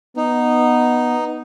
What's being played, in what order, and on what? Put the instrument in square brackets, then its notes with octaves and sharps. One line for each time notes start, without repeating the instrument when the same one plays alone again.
[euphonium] B3 [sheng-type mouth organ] D#4